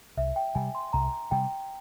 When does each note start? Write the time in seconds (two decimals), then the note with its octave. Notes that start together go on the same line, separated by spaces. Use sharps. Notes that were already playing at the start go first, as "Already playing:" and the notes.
0.17 C2 E5
0.36 G5
0.55 C3 G3 G#5
0.75 C6
0.93 C2 A#5
1.31 C3 G3 G5